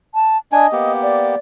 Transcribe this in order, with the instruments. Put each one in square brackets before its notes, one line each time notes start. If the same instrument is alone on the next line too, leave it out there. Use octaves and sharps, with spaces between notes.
[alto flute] A5
[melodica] D4 G#5 [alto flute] D#5
[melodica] A#3 B3 G4
[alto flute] D5